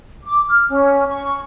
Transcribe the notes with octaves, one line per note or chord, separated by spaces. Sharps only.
D6
F6
C#4
C#6